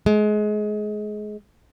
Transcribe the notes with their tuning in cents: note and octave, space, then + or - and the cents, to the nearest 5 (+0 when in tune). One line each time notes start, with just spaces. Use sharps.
G#3 +25